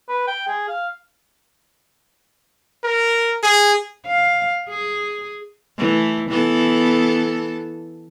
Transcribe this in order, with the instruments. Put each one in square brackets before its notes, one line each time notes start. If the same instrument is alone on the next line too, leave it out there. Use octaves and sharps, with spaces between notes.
[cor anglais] B4
G5
G#4
F5
[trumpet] A#4
G#4
[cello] F5
G#4
[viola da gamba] E3 A3
E3 B3 A4